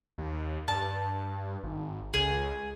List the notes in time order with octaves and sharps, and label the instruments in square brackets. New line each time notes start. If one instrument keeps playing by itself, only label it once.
[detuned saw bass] D#2
[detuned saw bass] G2 [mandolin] A5
[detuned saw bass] G#1
[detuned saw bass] C#2 [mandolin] G#4